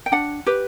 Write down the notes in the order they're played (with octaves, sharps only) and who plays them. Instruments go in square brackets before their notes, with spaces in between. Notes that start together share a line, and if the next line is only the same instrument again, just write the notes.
[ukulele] G5
D4 F#5
G4 B4